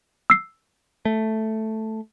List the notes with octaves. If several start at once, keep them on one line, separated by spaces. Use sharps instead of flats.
E6 C7
A3